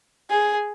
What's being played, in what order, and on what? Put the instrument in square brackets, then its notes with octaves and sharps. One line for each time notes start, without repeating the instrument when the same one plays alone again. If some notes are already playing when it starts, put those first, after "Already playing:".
[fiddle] G#4